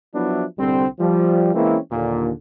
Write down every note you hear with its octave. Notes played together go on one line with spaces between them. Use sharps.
F3 F#3 B3 D4 E4
C2 D3 G3 C4
F3 G3
E3 G#3 A#3 C4 C#4 E4
D#2 A#2 D3